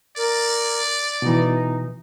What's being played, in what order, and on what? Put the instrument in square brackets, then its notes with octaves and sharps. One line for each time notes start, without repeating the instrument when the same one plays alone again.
[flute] A#4 [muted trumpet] D5
[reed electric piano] B2 E3 [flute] D#4